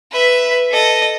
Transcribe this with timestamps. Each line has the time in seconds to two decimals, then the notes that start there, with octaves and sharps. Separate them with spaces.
0.12 B4 E5
0.71 A4 D#5